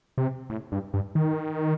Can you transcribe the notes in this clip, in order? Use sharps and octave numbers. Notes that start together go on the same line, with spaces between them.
C3
A2
G2
G2
D#3